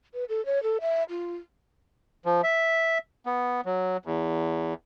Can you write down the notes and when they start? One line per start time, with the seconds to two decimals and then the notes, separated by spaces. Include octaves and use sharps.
0.14 B4
0.29 A4
0.46 C#5
0.63 A4
0.81 E5
1.09 F4
2.25 F3
2.43 E5
3.26 B3
3.66 F#3
4.05 E2